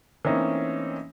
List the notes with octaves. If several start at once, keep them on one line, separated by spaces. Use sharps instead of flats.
E3 A3 A#3 C4 C#4 D#4